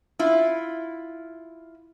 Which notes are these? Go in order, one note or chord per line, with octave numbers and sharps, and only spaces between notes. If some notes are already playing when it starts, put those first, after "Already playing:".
E4 F4